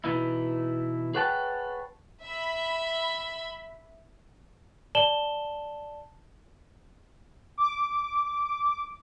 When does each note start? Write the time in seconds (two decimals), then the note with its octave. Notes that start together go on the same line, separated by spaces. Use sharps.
0.04 B2 E3 D#4 E4
1.14 G#4 B4 C#5 F#5 G5 A5
2.23 E5 B5
4.95 D5 A5 E7 F#7 G7
7.58 D6